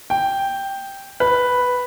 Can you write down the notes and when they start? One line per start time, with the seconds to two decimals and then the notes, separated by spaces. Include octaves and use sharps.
0.10 G5
1.20 B4